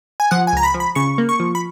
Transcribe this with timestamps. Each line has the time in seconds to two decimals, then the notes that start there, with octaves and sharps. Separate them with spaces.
0.20 G#5
0.31 F3 F#5
0.47 G#5
0.53 C#2 A#5
0.63 B5
0.74 F3
0.80 B5
0.95 C#3 C#6
1.18 A#3
1.29 C#6
1.40 F3
1.55 B5